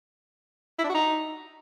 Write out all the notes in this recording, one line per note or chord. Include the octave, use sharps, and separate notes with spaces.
E4
D4
F#4
D#4